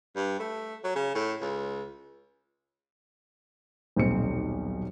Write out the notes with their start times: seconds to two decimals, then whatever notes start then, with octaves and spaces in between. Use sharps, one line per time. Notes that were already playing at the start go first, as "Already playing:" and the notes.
0.16 G2
0.40 A3
0.84 F#3
0.96 C#3
1.15 A2
1.41 C#2
3.96 D#1 B1 C4 C#7